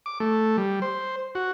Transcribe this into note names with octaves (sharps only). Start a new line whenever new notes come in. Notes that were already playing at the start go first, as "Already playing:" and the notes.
D6
A3
G3
C5
F#4